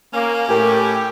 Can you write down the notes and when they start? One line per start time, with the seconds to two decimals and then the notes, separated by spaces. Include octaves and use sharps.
0.14 A#3 C#4
0.49 A2 G4 A#4 G#5